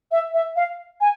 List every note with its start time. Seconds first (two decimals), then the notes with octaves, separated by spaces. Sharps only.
0.12 E5
0.34 E5
0.56 F5
1.01 G#5